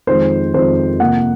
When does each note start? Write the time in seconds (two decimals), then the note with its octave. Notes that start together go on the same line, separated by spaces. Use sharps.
0.07 F2 D#3 G#3 C5
0.54 F2 D#3 G#3 C5
1.00 C3 F3 A#3 F#5